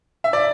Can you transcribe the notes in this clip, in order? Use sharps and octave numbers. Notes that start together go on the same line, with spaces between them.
E5
D5